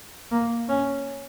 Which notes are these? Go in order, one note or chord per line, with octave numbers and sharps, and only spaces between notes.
A#3
C#4